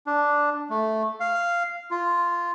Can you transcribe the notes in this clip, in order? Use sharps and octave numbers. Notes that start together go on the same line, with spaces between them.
D4
A3
F5
F4